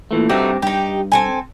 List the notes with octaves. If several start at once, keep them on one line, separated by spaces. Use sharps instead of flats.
A#2 E3 A3
G2 A3 C4 D#4 F#4 G4
G2 D#4 G4
C4 A4 G#5